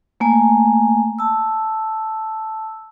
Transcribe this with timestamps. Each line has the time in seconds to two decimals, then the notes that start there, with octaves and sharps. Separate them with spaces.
0.20 A3 A#3 G#5
1.19 A5 E6